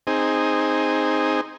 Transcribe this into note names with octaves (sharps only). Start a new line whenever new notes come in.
C4 D#4 G#4